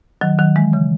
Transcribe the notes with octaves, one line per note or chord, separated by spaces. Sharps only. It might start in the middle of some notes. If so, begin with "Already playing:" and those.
D#3 F#3
D#3 F#3
E3 G#3
C#3 E3